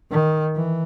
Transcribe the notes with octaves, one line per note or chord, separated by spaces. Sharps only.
D#3
E3